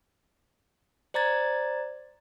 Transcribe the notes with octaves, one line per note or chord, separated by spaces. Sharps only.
C5 D5 A#5 G#6 A6